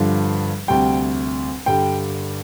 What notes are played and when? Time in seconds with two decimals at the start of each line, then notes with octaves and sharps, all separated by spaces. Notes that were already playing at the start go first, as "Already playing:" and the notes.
Already playing: G2 D3 F3
0.68 D2 C3 G3 G5
1.66 G2 D3 G3 G5